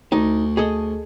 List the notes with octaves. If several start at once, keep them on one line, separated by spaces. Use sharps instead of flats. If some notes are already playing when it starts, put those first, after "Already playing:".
D2 D#4
G#4 A4 D#5